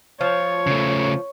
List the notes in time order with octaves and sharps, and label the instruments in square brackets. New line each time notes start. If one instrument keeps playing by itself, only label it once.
[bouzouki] F3 [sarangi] C#5
[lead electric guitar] C#3 A3